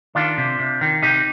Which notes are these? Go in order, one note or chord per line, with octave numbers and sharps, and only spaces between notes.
D#3 D4 F4
C3
C3
D#3
C3 D#4 G4